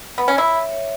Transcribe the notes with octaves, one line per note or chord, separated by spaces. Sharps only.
B3
C#4
E4 C#5
E5
C#5